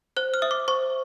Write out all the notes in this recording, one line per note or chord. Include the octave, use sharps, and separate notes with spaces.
C5 F#6
F6
E5 D#6
D6
C5 C#6